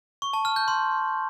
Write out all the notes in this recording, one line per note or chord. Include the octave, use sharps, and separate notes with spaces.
C#6
A5
F6
G6
C6